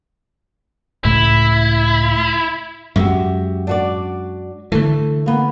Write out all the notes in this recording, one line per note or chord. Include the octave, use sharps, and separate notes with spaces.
C#2 A2 A3 E4
F#2 G#3 F#4 G4 E5
D4 F#4 D5
D3 E3 A3
A#3 B3